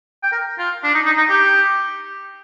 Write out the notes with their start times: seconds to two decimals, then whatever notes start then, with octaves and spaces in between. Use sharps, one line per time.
0.23 G5
0.32 A#4
0.59 F4
0.84 D4
0.94 D#4
1.06 D#4
1.17 D#4
1.29 G4